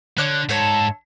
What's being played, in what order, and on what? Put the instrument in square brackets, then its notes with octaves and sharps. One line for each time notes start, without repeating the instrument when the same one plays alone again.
[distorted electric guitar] D3 [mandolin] C#5 D5 F#6
[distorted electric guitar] G#2 [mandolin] A4 C#5